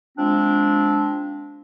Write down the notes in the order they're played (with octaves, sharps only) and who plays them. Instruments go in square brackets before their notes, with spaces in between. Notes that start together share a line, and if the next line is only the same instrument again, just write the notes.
[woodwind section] F3 G#3 C4 D4